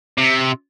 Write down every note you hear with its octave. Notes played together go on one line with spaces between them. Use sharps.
C3